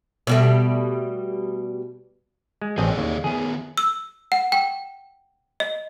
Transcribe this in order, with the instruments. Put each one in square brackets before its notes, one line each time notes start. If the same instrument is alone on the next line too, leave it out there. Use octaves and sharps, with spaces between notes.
[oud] B2 G3 A3
[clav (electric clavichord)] G#3
[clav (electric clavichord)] A1 C4 D#5 [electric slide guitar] G#4 A4 D5
[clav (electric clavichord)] D#2
[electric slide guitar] D#3 B3 [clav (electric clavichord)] G#4
[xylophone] E6
F#5
G5
D#5